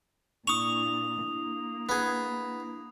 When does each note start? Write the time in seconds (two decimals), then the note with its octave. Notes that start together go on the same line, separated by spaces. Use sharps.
0.47 A#2 D4 E4 C#6 D#6 F7
1.24 A#3
1.89 B3 G#4